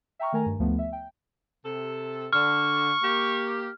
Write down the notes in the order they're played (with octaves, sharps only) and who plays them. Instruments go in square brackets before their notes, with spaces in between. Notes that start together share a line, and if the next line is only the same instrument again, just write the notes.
[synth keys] E5 G5 A#5 C#6 F6
D#3 A3 A#4 G#5 A#5
G2
D2 F3 A3 B3
E5
G5
[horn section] C3 A4
[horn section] D3 [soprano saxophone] C#6 [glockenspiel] F6
[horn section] A#3 G4